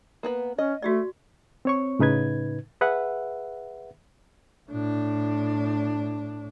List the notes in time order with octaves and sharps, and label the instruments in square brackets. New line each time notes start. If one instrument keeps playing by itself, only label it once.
[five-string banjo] A#3 B3 B4
[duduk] C#4 [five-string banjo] D#5
[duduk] A3 [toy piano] F#4 G4 D5
[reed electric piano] C4 C#5 C#6
A2 C#3 D#4 B4 G#6
G#4 B4 E5 F#5
[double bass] A2 D4